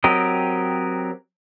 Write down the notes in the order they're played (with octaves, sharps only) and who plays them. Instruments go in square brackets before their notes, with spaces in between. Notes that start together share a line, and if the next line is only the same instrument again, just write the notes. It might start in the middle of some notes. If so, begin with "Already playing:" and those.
[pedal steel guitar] F#3 C4 G4 A#4 D#5